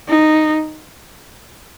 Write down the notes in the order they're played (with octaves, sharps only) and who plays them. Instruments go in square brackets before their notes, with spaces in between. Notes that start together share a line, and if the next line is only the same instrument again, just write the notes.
[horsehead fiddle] D#4